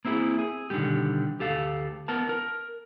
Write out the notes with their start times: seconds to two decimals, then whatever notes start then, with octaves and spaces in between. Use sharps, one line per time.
0.05 A#3 C4 E4 F4 G#4
0.39 G#4
0.70 B2 D3 D#3 G3 G#3 G4
1.39 D2 G4 A4 F5
2.08 B3 A#4 A5
2.29 A#4